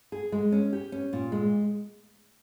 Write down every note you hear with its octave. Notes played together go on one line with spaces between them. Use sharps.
G#4
G#3
C#4
G4
C#4
A#2
G#3